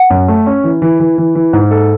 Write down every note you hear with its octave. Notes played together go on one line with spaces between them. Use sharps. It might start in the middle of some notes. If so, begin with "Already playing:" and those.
Already playing: F#5
F#2
A3
C#4
E3
E3
E3
E3
E3
G#2
A4